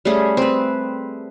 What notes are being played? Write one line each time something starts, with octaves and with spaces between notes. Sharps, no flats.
G3 A3 C#4 G#4
C4 B4